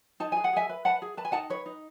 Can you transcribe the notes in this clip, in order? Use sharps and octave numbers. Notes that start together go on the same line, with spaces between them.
D#4 A5
G#4 G#5
F#5
G#4 E5 G#5
B4
B4 F#5 A5
G#4
B4 A5
G#5
D#4 F#5 A5
B4 C#5
D#4